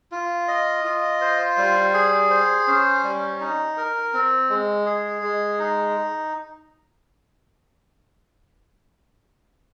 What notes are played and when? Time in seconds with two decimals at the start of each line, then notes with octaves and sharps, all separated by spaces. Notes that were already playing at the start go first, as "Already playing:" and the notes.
0.12 F4
0.48 D#5
0.84 F4
1.21 C5
1.57 G3
1.94 G#4
2.30 C5
2.67 C#4
3.03 G3
3.40 D#4
3.77 A#4
4.13 C4
4.49 G#3
4.86 G#4
5.22 G#3
5.59 D#4